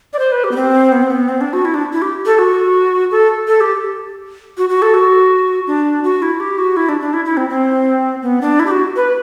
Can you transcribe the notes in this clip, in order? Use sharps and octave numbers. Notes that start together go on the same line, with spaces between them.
D5
C5
B4
G4
B3
C4
B3
C4
B3
C4
D4
F#4
E4
D4
E4
G4
A4
F#4
A4
A4
G4
F#4
F#4
A4
F#4
D4
F#4
E4
G4
F#4
E4
D4
D4
E4
E4
C4
C4
B3
D4
E4
G4
F#4
B4